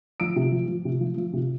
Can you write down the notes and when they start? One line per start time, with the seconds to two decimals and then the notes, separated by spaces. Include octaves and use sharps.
0.20 F3 D7
0.36 C3
0.52 F3
0.68 F3
0.85 C3
1.01 F3
1.17 F3
1.33 C3